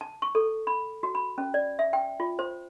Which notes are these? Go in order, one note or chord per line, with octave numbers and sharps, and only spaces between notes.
A5
C#6
A4
B5
F#4
B5
C#4
D5
E5
G5
F4
C5